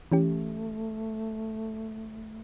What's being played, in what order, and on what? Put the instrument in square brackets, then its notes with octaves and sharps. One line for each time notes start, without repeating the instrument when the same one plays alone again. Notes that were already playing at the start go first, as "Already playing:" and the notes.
[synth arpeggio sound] E3 C#4 G4 [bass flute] A3